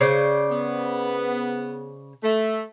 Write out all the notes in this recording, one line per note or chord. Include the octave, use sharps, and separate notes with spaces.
C#3 C5 D5
B3
A3